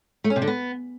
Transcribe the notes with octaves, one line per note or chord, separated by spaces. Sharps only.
A3
C#4
C3
D3
B3